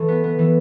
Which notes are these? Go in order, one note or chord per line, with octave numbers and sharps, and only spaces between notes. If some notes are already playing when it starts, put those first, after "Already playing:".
Already playing: E3 A3
B3
B3
E3